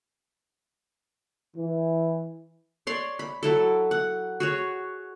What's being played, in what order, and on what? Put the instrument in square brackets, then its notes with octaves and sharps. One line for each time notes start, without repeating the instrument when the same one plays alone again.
[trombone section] E3
[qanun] C#5 D5 C6
B5
F#3 E4 A4
F#5
F#4 G#4 C#5